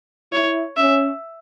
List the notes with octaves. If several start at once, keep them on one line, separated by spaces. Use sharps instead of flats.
E4 C#5
C#4 E5